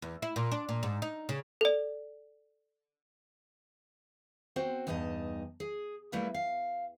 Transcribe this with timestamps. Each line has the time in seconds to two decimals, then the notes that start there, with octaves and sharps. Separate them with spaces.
0.02 E2
0.22 E4
0.36 A#2
0.52 D4
0.69 A#2
0.83 G#2
1.02 D#4
1.29 C#3
1.61 A4 D5
4.56 C4 F#4 C5
4.87 E2 G2 D#4 D#5 A5
5.60 G#4
6.12 G3 A3 A#3 E4 B4 E5
6.34 F5